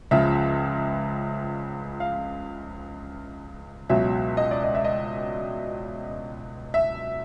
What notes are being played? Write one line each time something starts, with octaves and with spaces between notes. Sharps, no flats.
C#2 C#3 F3 E5
F5
C#2 B2 F#3 E5
D#5
D5
D#5
E5
D#5
E5